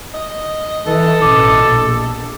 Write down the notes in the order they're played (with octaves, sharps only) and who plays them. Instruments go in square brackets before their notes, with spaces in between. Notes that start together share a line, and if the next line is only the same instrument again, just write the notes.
[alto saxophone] D#5
[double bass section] E3 [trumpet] A4
[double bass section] A1 B2 [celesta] D6
[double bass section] A#1